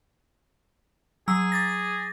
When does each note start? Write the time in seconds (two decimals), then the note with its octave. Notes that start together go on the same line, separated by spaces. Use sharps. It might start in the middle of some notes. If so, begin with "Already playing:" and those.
1.28 F#3 G#4 A#5 E6
1.52 D6 A6 A#6